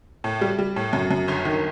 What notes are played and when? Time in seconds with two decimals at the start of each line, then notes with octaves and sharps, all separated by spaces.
0.24 A2
0.41 G3
0.59 G3
0.76 A2
0.93 F#2
1.11 F#2
1.28 G1
1.45 D#3